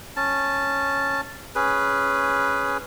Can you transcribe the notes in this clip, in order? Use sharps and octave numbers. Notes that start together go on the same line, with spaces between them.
C#4 A5
C#4 G#4 B4